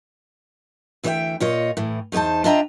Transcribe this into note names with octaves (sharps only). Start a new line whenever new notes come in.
D2 E3 B4 C5 E5 G5
A#2 F4 C#5 D#5
A2 E3
E2 A3 D#4 C5 A5
D4 F4 D#5 E5 G5 A#5